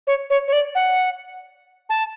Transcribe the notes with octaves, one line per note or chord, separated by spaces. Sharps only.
C#5
C#5
C#5
D5
F#5
A5